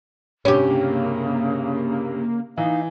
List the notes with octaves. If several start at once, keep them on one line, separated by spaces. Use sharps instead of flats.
G2 C3 C#4 G4
C#3 A#3
E3 D#4 F5